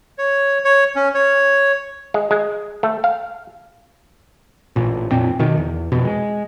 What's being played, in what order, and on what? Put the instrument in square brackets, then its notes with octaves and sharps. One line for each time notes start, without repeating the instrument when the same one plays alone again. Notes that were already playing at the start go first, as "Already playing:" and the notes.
[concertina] C#5
C#5
C#4
C#5
[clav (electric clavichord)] G#3
G#3
A3
F5
[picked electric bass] A1 A#2
F2 A#2 C4
B2 D#3
E2
F2 B2
G#3